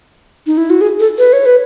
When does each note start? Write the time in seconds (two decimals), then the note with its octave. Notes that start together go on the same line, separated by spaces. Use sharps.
0.47 D#4
0.57 E4
0.70 F#4
0.81 G#4
1.00 A4
1.18 B4
1.33 C#5
1.46 B4